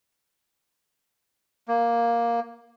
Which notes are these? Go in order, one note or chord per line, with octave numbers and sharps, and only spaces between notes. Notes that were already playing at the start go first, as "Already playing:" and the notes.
A#3